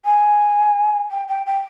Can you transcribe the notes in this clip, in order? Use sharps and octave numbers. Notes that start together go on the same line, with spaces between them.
G#5
G5
G5
G5